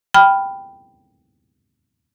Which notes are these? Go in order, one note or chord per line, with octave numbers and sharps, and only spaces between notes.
G5 B5 F6